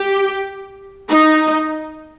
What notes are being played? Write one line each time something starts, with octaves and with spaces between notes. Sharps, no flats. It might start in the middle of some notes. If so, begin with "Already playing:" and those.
Already playing: G4
D#4